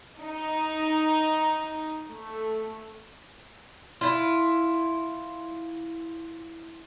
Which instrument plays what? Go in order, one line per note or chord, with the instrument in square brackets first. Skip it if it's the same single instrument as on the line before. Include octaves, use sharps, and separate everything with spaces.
[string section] D#4
A3
[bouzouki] E4 F4